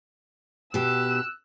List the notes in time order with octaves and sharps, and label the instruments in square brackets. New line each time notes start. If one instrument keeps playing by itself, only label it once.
[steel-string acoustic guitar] B2 G4 [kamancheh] E6 F#6